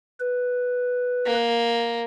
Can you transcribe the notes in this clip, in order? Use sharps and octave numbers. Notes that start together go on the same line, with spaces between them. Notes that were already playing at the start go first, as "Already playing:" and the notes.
B4
A#3